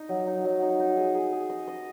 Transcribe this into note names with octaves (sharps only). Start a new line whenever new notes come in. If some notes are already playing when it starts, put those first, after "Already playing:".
Already playing: D#4
F#3
D#4
F#3
D#4
D#4
G#4
G#4
G#4
D#5
D#5